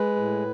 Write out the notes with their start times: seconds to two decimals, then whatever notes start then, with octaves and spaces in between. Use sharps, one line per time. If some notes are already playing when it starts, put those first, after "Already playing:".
Already playing: G#3 B4
0.16 A2